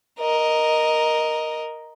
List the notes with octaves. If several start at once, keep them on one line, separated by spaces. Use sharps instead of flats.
A#4 D#5